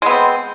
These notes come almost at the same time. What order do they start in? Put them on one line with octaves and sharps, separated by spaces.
G#3 B3 C4